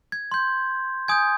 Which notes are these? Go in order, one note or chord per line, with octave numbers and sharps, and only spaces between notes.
G#6
C6 G6
G#5 D#6 G6 G#6